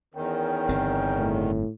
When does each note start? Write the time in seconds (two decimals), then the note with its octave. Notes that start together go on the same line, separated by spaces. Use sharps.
0.14 E2 D#3 C#4 A#4 G5
0.69 G1 C#3 C4
1.18 A2